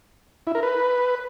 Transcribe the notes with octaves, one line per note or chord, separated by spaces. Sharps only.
E4
A#4
B4